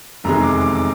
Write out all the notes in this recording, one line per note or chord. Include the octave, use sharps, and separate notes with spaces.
F1 E2 C3 D#3 G#3 A#5
D6
D6
D6